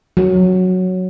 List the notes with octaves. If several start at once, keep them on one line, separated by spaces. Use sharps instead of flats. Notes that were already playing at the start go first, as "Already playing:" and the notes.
F#3